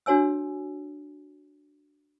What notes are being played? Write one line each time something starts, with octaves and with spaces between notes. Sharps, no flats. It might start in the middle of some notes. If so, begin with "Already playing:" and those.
D4 F#4 C#5 G#5 E6